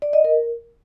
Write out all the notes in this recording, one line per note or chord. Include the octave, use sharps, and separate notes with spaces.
D5
D#5
A#4